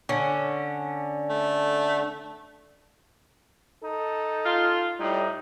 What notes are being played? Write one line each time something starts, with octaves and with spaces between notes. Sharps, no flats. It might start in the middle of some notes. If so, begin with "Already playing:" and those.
D3 C#4
A3
D#4 A4
F4
A2 G3 D#4